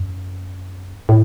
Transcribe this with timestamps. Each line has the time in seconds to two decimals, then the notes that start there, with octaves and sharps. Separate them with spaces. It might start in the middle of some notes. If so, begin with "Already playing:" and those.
Already playing: F#2
1.09 A2